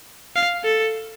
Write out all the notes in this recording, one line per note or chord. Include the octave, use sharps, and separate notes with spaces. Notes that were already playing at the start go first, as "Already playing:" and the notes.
F5
A4